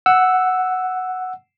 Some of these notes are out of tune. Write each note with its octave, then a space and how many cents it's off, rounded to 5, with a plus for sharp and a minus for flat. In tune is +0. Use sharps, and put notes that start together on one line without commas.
F#5 +0 E6 +0